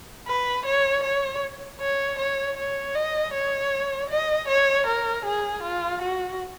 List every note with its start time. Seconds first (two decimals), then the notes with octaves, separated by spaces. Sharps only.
0.28 B4
0.66 C#5
1.04 C#5
1.81 C#5
2.19 C#5
2.57 C#5
2.95 D#5
3.34 C#5
4.10 D#5
4.48 C#5
4.87 A#4
5.26 G#4
5.63 F4
6.02 F#4